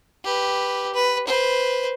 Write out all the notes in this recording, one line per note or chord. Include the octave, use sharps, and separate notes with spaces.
G4 B4
B4
B4 C5